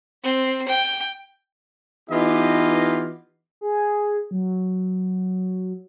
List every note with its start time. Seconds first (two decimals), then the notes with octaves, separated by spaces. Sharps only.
0.23 C4
0.68 G5
2.10 E3 B3 D#4 F4 G4 D#5
3.61 G#4
4.31 F#3